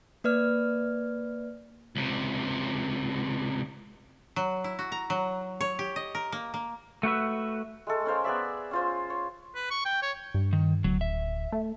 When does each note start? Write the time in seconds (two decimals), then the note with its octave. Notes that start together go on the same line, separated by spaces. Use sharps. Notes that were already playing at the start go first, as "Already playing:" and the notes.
0.24 A#3 B4 D5 F6
1.96 C#2 C3
4.36 F#3
4.64 E4
4.79 F#4
4.92 A#5
5.10 F#3
5.61 C#5
5.79 G4
5.96 D#5
6.15 A#4
6.32 A#3
6.54 A#3
7.03 A3 F#4 B4 E5
7.87 G#3 A3 A4
8.06 C#4 A#4 C5 F5
8.24 B3 G#4 D5 E5
8.71 C#4 F4 C5
9.10 C#5
9.55 B4
9.71 C#6
9.85 G5
10.02 C#5
10.34 G2
10.53 D#3
10.84 D1 F#3
11.01 E5
11.52 A3